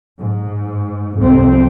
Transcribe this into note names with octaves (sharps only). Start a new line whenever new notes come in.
G#2
C2 F2 C4